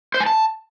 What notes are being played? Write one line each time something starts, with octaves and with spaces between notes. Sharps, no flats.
C5
G#5
A5